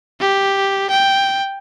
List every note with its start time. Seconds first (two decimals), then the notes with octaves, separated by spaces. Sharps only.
0.20 G4
0.90 G5